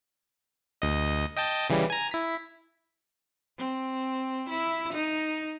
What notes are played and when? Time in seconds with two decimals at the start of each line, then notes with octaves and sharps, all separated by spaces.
0.82 D2 D#5
1.36 D#5 G5 A5
1.70 C#3 E3 G3
1.90 G#5 A#5
2.11 E4 B6
3.58 C4
4.49 E4
4.93 D#4